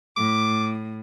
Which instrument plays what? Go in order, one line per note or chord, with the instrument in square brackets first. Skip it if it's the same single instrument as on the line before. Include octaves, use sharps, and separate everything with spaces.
[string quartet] A2 [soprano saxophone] D6